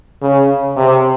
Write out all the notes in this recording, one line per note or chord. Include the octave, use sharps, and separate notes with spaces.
C#3
C3